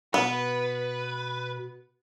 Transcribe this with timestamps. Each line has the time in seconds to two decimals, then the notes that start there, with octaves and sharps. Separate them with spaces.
0.14 B2 B3 B4